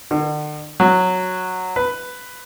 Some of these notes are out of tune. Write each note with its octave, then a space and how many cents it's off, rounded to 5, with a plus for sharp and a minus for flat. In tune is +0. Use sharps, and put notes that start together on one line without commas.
D3 +40
F#3 -10
B4 +10